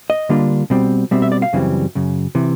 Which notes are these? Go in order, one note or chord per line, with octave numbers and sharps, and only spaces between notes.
D#5
D3 G3 A#3 D4 F4
B2 G3 C4
B2 G3 C4 E5
E5
D5
F5
F#2 C#3 E3 G3 C4
F#2 C#3
C3 E3